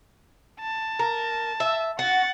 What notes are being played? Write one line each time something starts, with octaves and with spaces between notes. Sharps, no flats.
A5
A#4
E5
F#4 F#5 A6